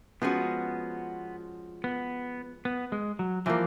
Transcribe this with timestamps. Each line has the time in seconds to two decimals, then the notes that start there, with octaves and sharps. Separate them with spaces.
0.22 F3 G#3 B3 C#4 F#4
1.84 B3
2.65 B3
2.92 G#3
3.19 F#3
3.46 E3 F3 G3 A#3